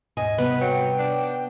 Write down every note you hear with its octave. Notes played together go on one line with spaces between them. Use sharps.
D#2 G#2 B2 D#5 G#5
C3 G3 B3 D#4 B4
F#3 G5
D4